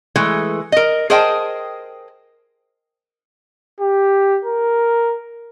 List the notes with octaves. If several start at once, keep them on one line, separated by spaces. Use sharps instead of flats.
E3 G#3 A3
A#4 D#5
G#4 A#4 C5 D#5 G5 A5
G4
A#4